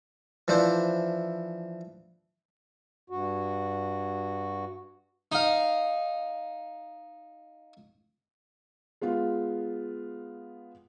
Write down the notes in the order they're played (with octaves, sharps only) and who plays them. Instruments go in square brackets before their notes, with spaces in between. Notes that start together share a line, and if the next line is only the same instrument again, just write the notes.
[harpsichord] E3 F3 D4 E4 C5
[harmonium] G2 F#4
[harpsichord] D#4 F5
[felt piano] G#3 B3 F4